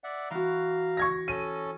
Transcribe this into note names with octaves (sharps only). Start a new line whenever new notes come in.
D5 E5 F#5
E3 F#4 F5 A#5
C#6 G#6 A#6
C#4 A4 D#7